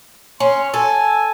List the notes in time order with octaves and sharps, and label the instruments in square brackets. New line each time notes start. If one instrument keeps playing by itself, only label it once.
[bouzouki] C#4 [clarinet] C6
[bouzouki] A4 [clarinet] G#5